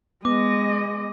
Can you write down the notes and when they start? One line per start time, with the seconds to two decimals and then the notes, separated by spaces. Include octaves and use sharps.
0.25 G#3 B3 D#5 D6